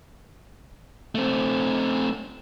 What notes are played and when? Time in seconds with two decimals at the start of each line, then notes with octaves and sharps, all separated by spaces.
1.15 A3 C4